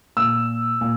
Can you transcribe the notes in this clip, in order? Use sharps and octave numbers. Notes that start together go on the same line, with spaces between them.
A#2 E6
A#2